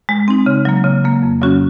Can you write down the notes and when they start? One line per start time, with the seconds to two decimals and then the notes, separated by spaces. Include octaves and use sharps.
0.09 G#3
0.28 C4 D#4
0.46 C#3
0.65 F#3 A#3
0.84 C#3
1.04 F#3 A#3
1.23 F2
1.41 C#3 F#3 C#4 F#4